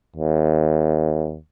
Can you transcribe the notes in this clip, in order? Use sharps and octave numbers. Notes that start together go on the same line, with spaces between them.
D#2